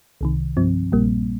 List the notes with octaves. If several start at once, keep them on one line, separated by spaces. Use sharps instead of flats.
C2 C3 D#3
G2 F3 C4
A#1 A#2 G3 A#3